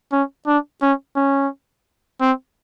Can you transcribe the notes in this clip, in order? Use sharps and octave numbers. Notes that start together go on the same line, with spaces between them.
C#4
D4
C#4
C#4
C4